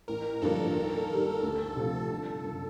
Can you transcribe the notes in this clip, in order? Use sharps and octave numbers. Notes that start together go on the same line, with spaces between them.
A1 A#4
G2 D3 F3 A#3 A4
D#2
D#3 G3
D2
C3 F3
G1 A4
F#2 C#3